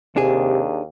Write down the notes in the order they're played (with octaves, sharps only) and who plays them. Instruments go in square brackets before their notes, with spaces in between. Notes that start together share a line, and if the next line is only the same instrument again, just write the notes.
[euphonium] D#2 [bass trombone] C3 [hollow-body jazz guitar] D4 G#4